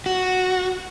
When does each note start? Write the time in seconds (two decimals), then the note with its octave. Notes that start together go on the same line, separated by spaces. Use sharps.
0.06 F#4